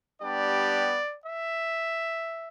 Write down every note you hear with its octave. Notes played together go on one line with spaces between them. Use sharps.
G3 B3 D4 G4 D5
E5